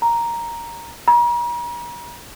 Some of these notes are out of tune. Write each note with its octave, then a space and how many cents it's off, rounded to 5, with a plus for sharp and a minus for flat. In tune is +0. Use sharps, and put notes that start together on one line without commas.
A#5 +0
A#5 +40